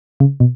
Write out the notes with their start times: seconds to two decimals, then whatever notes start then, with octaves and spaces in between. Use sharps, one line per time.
0.20 C#3
0.40 B2